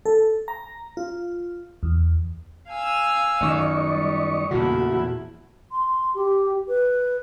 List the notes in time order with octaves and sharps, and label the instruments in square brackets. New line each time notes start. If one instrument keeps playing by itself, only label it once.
[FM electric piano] A4
A#5
F4
E2
[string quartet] F5 G#5 E6
[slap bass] F#2 D#3 [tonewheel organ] D5 D#5 C#6
[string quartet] G3
[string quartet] E2 A3 E4 [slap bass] A#2 C#3 [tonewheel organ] F#4
[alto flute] C6
G4
B4